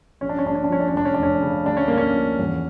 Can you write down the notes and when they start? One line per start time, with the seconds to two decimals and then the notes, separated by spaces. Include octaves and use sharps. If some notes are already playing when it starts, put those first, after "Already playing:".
0.21 A#1 C#4
0.29 D4
0.38 C#4
0.45 A#1 D4
0.55 C#4
0.64 D4
0.70 F3 C#4
0.80 D4
0.89 C#4
0.94 F1 D4
1.05 C#4
1.14 D4
1.19 F1 C#4
1.42 C#3
1.66 D2 D4
1.77 C#4
1.88 D2 A#3
1.97 C#4
2.15 F3
2.39 E2